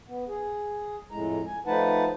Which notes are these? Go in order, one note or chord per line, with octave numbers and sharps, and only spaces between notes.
B3
G#4
F2 A2 G#3 A#5
G#5
F3 A3 D#4 B4 F#5 A5